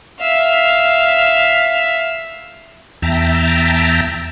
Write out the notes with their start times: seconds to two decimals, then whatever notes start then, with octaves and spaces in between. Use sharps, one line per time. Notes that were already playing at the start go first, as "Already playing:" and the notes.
0.22 E5 F5
3.02 E2 E5 G5 A5 A#5